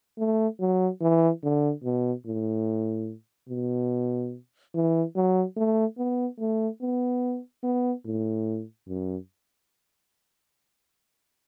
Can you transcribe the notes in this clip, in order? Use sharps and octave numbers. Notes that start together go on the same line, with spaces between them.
A3
F#3
E3
D3
B2
A2
B2
E3
F#3
A3
B3
A3
B3
B3
A2
F#2